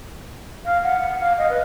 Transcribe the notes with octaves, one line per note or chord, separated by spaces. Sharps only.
F5
F#5
F#5
F5
D#5
B4